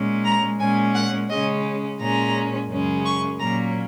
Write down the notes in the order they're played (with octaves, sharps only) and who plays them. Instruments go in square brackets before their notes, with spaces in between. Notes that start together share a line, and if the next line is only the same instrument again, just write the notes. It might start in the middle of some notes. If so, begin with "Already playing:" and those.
Already playing: [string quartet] A#2 G#3 C#4
A#5
A#2 G#3 C#4 G#5
F#5
C#3 G#3 C#4 D#5
A#2 G#3 C#4 A#5
F#2 C#3 G#3 C#4
C#6
A#2 F#3 A#3 C#4 A#5